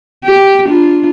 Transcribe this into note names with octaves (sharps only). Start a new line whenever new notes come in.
G4
D4 F4